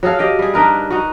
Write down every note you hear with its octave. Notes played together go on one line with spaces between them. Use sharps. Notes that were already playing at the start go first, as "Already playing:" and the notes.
F#3 G#4 A4 F5
G4 D#5 F5 G5
G3 G#4
D4 D#4 A#4 B4
D#4 F#4